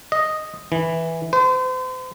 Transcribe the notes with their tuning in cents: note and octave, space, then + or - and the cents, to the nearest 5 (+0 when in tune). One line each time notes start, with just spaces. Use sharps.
D#5 +0
E3 -5
C5 -40